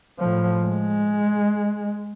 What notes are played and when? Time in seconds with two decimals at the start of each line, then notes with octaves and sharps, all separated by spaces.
0.19 A2 F3
0.64 G#3